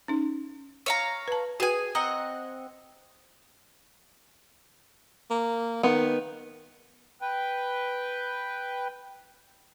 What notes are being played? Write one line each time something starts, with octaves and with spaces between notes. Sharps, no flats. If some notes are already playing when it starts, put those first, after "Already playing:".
C#4 D#4
C#5 F5 A#5
B4 A5
F#4 G#4 B4 G5 G#5
C4 D#5 F#5 A#5
A#3
D#3 B3
B4 G5